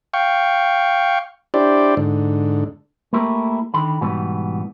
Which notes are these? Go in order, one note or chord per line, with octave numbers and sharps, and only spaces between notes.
F5 G5 C#6
D4 E4 G4 C5 D5
G#2 D3
A3 A#3 E4 G4 A#4
D3 D#3 B5
G#2 B2 E3 G3 B3